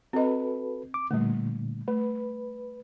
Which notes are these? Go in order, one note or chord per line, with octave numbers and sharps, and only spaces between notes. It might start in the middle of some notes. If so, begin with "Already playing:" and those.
C4 F#4 A4 B4 D#5
D6
A#2 D3 G3 A3
A3 B4